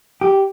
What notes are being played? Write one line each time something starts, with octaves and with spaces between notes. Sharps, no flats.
G4